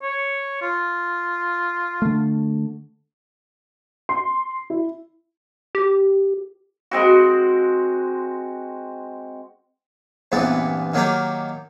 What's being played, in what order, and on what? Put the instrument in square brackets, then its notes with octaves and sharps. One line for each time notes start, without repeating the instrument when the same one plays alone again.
[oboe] C#5
F4
[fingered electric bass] D3 A3
[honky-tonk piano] C6
E4
[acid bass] G4
[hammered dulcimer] G#3 C4 F#4
[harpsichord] E2 G2 A#2 B3 C4 D5
D#3 F#3 A#3 G4 A#4